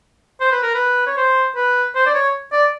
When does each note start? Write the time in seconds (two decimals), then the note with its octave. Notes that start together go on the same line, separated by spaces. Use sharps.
0.40 C5
0.52 B4
0.63 A#4
0.74 B4
1.07 C#5
1.17 C5
1.56 B4
1.95 C5
2.06 D5
2.14 C#5
2.52 D5